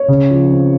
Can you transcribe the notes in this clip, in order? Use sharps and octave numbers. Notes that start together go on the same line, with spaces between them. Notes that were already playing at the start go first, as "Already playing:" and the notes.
Already playing: C#5
C#3
F3
C4